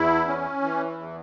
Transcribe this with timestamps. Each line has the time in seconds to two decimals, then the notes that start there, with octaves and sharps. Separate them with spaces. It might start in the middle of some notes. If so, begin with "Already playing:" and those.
Already playing: E2 E4
0.27 C#4
0.62 E3
0.97 E2